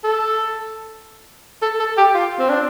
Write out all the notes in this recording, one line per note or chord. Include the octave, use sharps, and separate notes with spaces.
A4
A4
A4
G4
F4
C4
D4